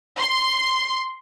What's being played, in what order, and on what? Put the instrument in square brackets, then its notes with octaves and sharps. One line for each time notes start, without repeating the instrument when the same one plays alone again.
[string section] C6